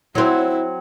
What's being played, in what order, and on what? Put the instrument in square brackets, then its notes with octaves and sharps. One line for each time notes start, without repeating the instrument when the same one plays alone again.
[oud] F#3 C4 [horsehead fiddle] E4